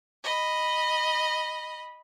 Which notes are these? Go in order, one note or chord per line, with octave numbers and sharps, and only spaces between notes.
D#5 B5